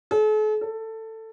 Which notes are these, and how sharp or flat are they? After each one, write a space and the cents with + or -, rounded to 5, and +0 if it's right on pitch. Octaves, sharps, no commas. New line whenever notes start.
A4 -45
A4 +15